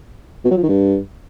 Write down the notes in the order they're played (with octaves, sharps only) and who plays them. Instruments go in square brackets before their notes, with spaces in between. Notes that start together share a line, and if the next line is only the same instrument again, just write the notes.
[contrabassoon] B2
F#3
F3
D#3
G2